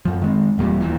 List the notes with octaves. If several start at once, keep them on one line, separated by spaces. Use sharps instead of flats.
F#2 F3
D#3 G#3 C4
E1 E2 A#2 G3
D#2 A#2 E3